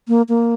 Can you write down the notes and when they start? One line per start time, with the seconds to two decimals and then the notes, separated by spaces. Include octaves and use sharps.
0.08 A#3
0.29 A#3